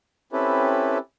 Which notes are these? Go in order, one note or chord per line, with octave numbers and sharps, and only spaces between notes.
C4 C#4 E4 G4 A4 B4